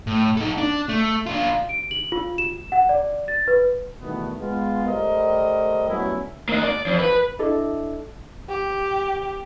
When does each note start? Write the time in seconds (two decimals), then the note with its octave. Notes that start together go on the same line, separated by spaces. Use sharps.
0.07 A2
0.37 D#4 A4
0.58 D4
0.89 A3
1.26 D4 F4
1.69 D7
1.91 F#7
2.12 F4
2.38 E7
2.72 F#5
2.89 D5
3.28 A6
3.48 B4
4.01 B2 D#3 E3 G3 A3 B3
4.39 G#3 B3 F4
4.87 G3 A3 A#4 C5 D#5
5.89 F#3 G3 A3 B3 C#4 E4
6.49 A#3 D#5
6.63 D5
6.86 F2
6.99 B4
7.39 D4 E4 A4 D#5
8.49 G4